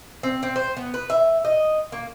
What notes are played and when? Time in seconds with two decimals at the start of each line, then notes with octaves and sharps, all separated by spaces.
0.23 C4
0.43 C4
0.56 C5
0.77 B3
0.94 B4
1.10 E5
1.45 D#5
1.92 A#3